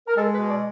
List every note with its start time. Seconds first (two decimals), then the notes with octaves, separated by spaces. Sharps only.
0.07 A#4
0.16 G#3 A4
0.32 B4
0.37 B2
0.48 D5